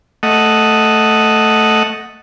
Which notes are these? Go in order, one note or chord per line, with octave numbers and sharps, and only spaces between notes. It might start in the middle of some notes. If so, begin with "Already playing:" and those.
A3 D#5 F#5